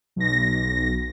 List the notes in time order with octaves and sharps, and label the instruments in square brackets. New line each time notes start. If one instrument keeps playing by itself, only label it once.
[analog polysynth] B1 A#6